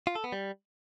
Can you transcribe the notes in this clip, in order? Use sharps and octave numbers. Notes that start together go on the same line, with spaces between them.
F4
A4
B3
G3